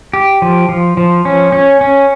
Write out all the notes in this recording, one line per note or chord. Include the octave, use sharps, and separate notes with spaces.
G4
F3
F3
F3
C#4
C#4
C#4